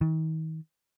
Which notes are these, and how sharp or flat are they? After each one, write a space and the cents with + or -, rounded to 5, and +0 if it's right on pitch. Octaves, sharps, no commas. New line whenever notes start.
D#3 +40